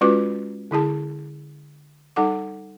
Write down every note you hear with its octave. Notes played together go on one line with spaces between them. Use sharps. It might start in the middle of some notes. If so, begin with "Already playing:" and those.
G#3 C#4 F4 F#4 B4 D6
D3 E4 G#4 A5
G3 D#4 A4 F#5 D6